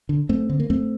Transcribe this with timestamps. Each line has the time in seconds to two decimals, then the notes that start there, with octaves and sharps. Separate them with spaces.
0.09 D3
0.29 F#2 A3 C4
0.49 D3 C4
0.60 A#3
0.70 F#2 A3 C4